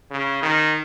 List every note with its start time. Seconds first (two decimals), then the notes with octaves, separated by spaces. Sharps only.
0.11 C#3
0.42 D#3